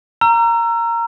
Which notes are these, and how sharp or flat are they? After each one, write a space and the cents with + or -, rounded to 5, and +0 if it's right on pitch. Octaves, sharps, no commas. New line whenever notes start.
A#5 -5 E6 +40